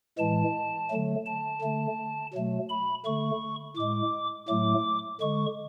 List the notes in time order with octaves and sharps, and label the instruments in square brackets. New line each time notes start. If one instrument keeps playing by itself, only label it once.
[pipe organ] A2 E3 G#3 A5
D3 F#3 A3
A5
D3 A3
B2 F#3 A3
B5
D3 A3 C#6
A2 G#3 D6
A2 F#3 A3 D6
D3 G#3 C#6